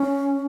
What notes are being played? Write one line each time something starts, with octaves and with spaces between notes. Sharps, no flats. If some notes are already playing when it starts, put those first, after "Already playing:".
Already playing: C#4